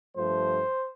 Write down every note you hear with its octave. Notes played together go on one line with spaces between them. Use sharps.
G2 F3 A3 C5